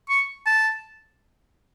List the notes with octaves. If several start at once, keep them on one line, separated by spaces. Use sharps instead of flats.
C#6
A5